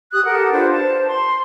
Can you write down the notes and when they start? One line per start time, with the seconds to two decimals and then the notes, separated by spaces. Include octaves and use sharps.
0.12 G4 D#6 F#6
0.25 G4 A4 A#4 F#5
0.52 D4 F4 B4 C5
0.71 C5 A5
1.08 C6